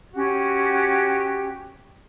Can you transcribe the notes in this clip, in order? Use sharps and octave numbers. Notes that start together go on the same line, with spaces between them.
C#4 F#4 G4